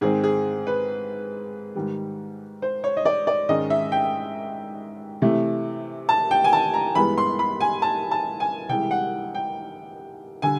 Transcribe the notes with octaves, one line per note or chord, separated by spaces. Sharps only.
G#2 D#3 G#3 C4 G#4
G#4
B4
G#2 D#3 G3
C5
C#5
D#5
D5
D5
G#2 D#3 G#3 C#4 D#5
E5
G5
C3 E3 A3
A5
G5
G#5
A5
A#5
G2 E3 G#3 B3 B5
C6
B5
G#5
A5
A5
G#5
C2 C3 E3 G#3 G5
F#5
G5
D3 G3 G#5